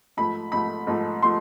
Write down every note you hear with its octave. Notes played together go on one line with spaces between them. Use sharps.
G#2 F3 A3 B5
G#2 F3 A3 B5
G#2 F3 A3
F3 A3 C6